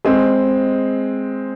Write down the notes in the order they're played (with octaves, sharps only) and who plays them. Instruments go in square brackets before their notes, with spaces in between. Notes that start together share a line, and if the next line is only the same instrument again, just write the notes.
[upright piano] G#3 C4